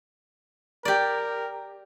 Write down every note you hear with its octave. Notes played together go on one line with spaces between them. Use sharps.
G4 A#4 D5